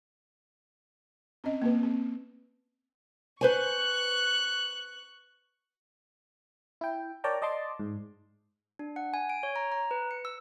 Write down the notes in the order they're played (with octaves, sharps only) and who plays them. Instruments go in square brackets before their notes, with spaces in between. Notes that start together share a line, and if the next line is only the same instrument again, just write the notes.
[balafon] C4 C#4 D#5
A#3 C4 B4
C4
[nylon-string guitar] B4 C5 G#5 [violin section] C#6 F#6
[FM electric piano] E4 G5
A#4 C#5 D5 G5 A5 A#5
D5 D#5 A5 C6 D6
G#2
[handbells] D4
F#5
G#5
D7
C#5
A#5
A#5
B4
C#7
E6